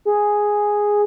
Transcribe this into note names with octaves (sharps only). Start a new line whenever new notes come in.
G#4